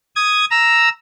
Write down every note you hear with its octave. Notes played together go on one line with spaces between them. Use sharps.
D#6 G#6
A#5 E6